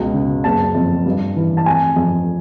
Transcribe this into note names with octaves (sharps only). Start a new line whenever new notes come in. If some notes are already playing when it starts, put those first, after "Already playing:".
Already playing: C#2 B2
C#3
F#1 A5
F2
G2
E3
A5
F1 G#5
F2